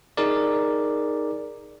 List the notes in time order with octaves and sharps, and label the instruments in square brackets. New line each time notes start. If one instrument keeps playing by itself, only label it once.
[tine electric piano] D#4 G#4 A#4 D5